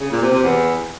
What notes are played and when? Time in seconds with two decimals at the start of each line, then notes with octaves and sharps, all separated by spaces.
0.01 C#3
0.11 A#2
0.22 C3
0.33 C3
0.43 E2